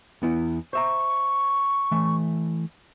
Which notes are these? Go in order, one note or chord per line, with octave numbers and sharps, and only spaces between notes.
E2 B3 E4
C5 E5 A#5 C#6
E3 A3